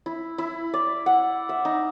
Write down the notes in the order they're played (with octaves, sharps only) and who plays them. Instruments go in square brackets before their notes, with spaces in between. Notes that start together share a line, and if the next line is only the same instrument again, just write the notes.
[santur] E4
E4
D5
F#5
E5
D#4